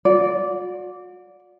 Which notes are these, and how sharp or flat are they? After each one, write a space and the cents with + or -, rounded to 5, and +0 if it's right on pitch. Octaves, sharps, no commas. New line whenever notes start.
F#4 -40 D5 -15